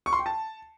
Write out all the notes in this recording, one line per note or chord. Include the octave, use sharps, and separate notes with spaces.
C#6
C6
G5
A5